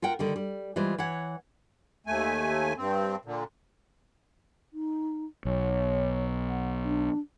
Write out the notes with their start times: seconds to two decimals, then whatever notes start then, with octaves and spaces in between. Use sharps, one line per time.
0.02 F4 A#4 F#5 G5
0.19 D3 D#3 G3
0.36 G3
0.76 E3 G3 G#3 F4 C5
0.98 E3 C#5 F#5
2.07 D#2 A3 G#5
2.78 G2 C4
3.25 A#2 D3
4.73 D#4
5.45 B1 C#5
6.48 F#5
6.84 D4